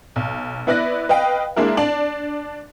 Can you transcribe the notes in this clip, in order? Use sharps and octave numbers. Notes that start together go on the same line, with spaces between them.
B1
B3 E4 B4 D5 F#6 A#6
B4 D#5 F5 G5
G#3 A#3 D4 E4 A#4
D4 D5 A5 F#7